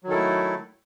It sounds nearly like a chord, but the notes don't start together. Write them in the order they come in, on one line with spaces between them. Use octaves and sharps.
F#3 D#3 A4 E4 A3